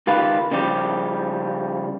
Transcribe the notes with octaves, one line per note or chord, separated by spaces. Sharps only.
C#2 D#3 F4 G4 B4
C#3 F3 G3 G4